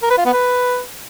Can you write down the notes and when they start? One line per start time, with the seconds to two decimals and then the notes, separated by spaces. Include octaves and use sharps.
0.03 A#4
0.10 B4
0.18 F4
0.25 B3
0.33 B4